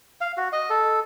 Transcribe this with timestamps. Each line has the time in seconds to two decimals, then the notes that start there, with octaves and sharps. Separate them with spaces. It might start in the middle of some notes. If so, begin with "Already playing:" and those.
0.21 F5
0.37 F#4
0.53 D#5
0.70 A4